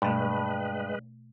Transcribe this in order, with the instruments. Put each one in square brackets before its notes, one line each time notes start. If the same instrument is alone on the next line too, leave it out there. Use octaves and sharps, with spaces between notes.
[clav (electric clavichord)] G2 [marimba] B2 A3 [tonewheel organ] G#3 B4